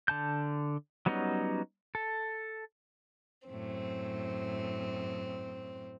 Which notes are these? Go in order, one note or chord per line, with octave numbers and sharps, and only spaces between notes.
D3 A5 G6
F#3 G3 B3 C#4 D#4
A4
F#2 A2 C4